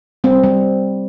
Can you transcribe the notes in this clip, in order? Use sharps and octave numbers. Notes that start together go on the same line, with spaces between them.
G3 C4
G3